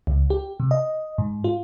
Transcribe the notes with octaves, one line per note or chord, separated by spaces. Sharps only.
C#2
G4
C3
D#5
G#2
F4